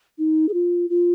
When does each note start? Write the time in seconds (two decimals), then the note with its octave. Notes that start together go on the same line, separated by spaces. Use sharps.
0.18 D#4
0.49 G#4
0.54 F4
0.90 F4